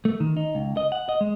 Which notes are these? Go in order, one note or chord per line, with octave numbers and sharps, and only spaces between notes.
A3
D#3
D#4
C#2
D#5
F#5
D#5
G#3